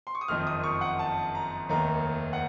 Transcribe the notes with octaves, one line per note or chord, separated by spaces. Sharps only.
C6
C#6
D#6
F#1 F2 D#3 F6
D#6
C#6
F#5
A5
A#5
F1 D#2 D#3 A#5
F#5